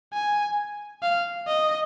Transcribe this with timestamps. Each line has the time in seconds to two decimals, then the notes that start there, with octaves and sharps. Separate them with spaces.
0.13 G#5
1.03 F5
1.48 D#5